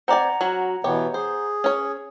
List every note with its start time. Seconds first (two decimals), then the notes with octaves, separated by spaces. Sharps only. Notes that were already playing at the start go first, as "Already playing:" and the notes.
0.08 C4 D5 F#5 G#5 A#5
0.41 F#3 C#4 F#4
0.84 B2 E3 B3 G4 C#5
1.14 G#4 C5
1.64 C#4 C#5